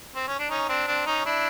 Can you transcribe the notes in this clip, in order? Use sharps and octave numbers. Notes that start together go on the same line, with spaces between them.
C4
C#4
D4
C#4 D#4
C4 D4
C4 D4
C#4 D#4
D4 E4